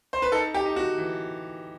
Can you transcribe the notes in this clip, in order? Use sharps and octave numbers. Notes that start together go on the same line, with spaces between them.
C5
B4
D#4 A4
G4
D#4
F#4
E3